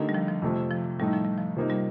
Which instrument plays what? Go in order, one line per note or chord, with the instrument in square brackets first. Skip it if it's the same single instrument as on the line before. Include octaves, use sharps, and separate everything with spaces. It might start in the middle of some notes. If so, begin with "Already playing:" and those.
Already playing: [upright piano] D3 A3 D#4 G4 A#4
[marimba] G3
F3
F3
[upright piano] F2 C3 F3 A3
[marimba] F3
[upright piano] A2 A3 D#4 [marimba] G3
[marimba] F3
G3
F3
[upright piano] C3 F3 A#3 D#4
[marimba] G3